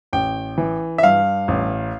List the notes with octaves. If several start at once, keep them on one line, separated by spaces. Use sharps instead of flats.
A1 G5
E3
E5
G2 F5
A1